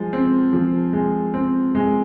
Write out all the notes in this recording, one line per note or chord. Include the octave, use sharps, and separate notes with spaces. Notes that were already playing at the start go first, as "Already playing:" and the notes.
Already playing: F3 G#3
C4
F3
G#3
C4
G#3